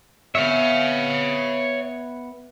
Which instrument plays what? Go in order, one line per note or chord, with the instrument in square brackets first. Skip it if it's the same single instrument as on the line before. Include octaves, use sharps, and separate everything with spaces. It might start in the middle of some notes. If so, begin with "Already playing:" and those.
[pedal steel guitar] B3 E5 [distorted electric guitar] C#5 F5